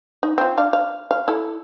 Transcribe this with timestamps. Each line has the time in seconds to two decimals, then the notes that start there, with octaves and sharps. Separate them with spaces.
0.23 D#4
0.38 C4 F4
0.57 D4 D5 F5
0.73 F5
1.11 F5
1.28 E4 A4